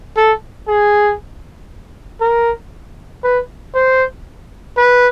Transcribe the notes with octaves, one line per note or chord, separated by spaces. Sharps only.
A4
G#4
A#4
B4
C5
B4